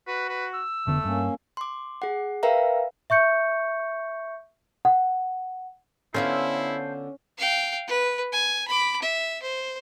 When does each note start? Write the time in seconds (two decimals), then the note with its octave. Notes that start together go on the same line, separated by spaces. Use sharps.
0.07 F#4 B4
0.29 B4
0.54 E6
0.87 F1 D3 A3 B3
1.05 G2 A#3 C#4
1.57 C6 D6
2.02 G#4 F#5
2.43 A#4 B4 E5 F5 G5 A#5
3.10 E5 C#6 G6 C#7
4.85 F#5
6.14 D3 B3 C#4 E4 F4 A4 C5
7.38 F5 G5
7.87 B4
8.32 G#5
8.68 B5 D6
9.02 E5
9.42 C5